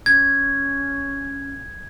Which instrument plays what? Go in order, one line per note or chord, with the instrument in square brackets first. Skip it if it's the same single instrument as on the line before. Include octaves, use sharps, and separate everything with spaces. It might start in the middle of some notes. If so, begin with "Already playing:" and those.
[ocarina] C#4 [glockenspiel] G#6